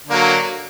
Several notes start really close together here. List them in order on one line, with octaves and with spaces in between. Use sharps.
D3 A#3 F#3